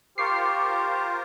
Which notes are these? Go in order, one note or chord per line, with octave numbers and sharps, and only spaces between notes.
F4 G4 A#4 C5 C#6 D6 C7